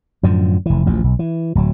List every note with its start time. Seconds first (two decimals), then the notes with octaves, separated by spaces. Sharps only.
0.23 F#2 A2 D3 F3
0.66 F1 E3
0.86 A1 D2 F3
1.04 B1
1.19 E3
1.55 D1 F#3